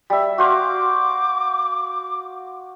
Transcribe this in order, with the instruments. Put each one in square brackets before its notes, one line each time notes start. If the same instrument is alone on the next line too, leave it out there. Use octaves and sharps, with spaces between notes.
[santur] G3 E5
[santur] F#4 C5 F5 [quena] D6